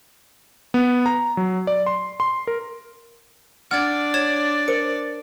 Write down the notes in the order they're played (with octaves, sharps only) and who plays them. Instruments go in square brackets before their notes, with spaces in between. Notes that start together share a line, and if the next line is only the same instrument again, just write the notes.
[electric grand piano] B3
A#5
F#3
D5
C6
C6
A#4
[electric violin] D4 D5 [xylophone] F#5 G#6 [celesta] F6
[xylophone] C#5 G#6 E7
[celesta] A#4 C5 [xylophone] C#7